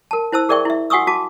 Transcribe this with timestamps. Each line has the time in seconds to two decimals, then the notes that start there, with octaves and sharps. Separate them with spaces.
0.11 A#4 A5
0.32 E4 C5 A5 E6
0.49 G#4 A#4 D5 E5 G5 C#6
0.65 E4 E5
0.90 F#4 F#5 G#5 C#6 D#6 E6
1.07 F#4 A5 D6